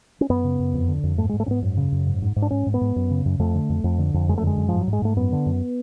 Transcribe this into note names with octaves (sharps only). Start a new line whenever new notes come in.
C#4
F#2 B3
C#3
F#2
F2
D3
F2
G#2 A3
G#3
G#2
A3
G#2 B3 C#4
F#2
C#3
F#2
G#2
G#2
G#2
D4
G#2 C#4
G#2
B3
G#2
F#2
C#3
F#2
F2 A3
D3
F2
F2
D3
F2
F#2 G#3
A3
D3 G#3
F#2
G#2 F3
F#3
G#2
G#3
G#2 A3
F#2 B3
D3
F#2